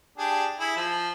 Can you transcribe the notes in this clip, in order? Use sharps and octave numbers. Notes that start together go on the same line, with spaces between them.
D4 G4 G#4
E4 G#4
F3